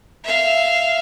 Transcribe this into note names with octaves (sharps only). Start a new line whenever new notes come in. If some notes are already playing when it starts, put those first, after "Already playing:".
E5 F5